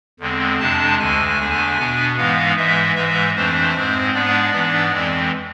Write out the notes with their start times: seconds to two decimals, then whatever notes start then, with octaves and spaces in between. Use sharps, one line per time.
0.20 E2 D3 G#3 C4
0.59 F2 C3 G#3 D4 A5
0.99 D2 D3 G#3 G#5
1.38 E2 D3 A3 D4
1.78 B2 B3 D4
2.16 G#2 E3 G#3 B3 F5
2.56 G#2 E3 G#3 E5
2.95 G#2 E3 G#3 E5
3.35 F2 E3 A3 D4 C5
3.75 G#2 G#3 C4
4.14 G#2 G#3 B3 D4 D5
4.52 G#2 E3 B3 D4
4.92 F2 E3 G#3 C4